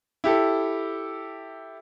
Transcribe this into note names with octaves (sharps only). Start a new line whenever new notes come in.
E4 G4 A4